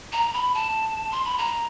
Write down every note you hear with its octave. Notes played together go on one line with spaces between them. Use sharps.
A#5
B5
A5
C6
B5
A#5